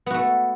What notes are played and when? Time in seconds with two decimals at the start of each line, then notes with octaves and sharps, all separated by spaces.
0.06 B3
0.10 F#4
0.14 A3